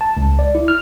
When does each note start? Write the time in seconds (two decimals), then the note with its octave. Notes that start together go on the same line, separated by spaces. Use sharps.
0.01 A5
0.17 C#2
0.39 D5
0.55 E4
0.68 F6